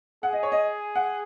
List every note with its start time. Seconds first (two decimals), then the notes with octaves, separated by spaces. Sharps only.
0.23 G#4 F#5
0.33 D#5
0.43 C#5
0.52 D#5
0.95 F#5